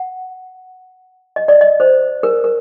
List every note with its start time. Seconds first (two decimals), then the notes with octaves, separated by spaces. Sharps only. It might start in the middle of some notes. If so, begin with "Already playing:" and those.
Already playing: F#5
1.36 D#5
1.48 D5
1.61 D#5
1.80 C5
2.23 A#4
2.44 A#4